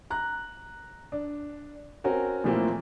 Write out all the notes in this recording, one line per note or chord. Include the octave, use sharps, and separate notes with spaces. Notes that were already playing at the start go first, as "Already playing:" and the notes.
A#5 F#6
D4
C4 C#4 F#4 A#4
A#2 E3 F3 A3 A#3 C4